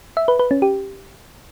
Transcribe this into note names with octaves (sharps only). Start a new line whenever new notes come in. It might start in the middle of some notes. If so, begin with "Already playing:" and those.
E5
B4
B4
C#4
G4